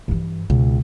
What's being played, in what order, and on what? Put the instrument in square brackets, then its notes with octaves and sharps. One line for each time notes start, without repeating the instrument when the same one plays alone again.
[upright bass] G2 E3
[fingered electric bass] C#2 [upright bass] B2